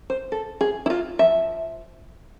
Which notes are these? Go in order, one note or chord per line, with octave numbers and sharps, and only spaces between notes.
C5
A4
G#4
E4
F4
F3 E5